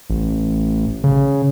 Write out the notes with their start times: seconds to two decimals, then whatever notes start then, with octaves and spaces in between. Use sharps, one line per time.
0.10 A1
1.04 C#3